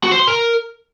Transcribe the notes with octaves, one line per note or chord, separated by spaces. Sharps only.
F#4
C5
C6
A#4